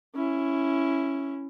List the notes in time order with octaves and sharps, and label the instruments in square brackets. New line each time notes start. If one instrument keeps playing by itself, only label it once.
[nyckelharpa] C#4 E4